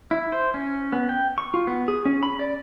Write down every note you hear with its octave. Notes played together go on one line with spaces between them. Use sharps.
E4
C5
C#4
B3
G5
C#6
F4
B3
G#4
C#4
B5
D5